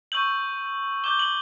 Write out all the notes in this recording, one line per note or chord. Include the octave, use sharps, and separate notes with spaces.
C#6 E6 G6 F#7
D6 G6 G7
F#7